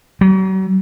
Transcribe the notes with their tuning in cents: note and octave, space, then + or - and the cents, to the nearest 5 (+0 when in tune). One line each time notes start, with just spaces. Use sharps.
F#3 +45